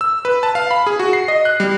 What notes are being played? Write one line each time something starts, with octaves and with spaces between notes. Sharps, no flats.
E6
B4
A5
F5
B5
G#4
F#4
C7
D#5
F#6
G3